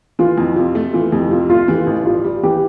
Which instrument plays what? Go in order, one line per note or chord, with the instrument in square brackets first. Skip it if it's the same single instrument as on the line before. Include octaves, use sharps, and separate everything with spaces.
[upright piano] E3 [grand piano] F4
[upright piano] F2
[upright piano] C3 [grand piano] F4
[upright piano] A3
[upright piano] E3 [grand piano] F4
[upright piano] F2 [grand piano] G4
[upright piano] C3 [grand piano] F4
[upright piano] A3 [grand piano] F4
[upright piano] E3 [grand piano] G4
[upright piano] A1
[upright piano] G2 [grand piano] F4
[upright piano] G3
[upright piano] E3 [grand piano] G4